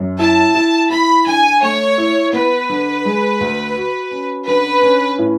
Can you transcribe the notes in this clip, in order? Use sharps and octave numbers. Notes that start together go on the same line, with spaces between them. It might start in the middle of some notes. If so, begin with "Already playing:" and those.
Already playing: F#2
E4 A5
E4
E4 B5
D3 G#5
A3 C#5
E4
B3 B4
D3
G#3
D2
F#4
C#4
D3 B4
C#4
A2